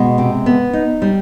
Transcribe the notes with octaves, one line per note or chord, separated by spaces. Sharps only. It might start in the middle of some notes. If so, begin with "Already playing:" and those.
Already playing: B2 G#3
C3
B3
D#4
G3